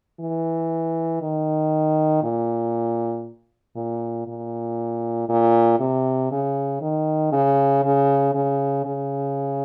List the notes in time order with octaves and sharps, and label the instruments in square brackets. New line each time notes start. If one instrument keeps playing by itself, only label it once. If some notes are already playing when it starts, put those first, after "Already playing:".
[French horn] E3
D#3
A#2
A#2
A#2
A#2
C3
C#3
D#3
C#3
C#3
C#3
C#3